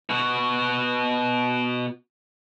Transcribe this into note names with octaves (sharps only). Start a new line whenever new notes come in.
B2 F#4